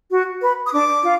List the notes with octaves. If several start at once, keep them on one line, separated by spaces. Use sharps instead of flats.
F#4
B4
D#6
D4 D6
F4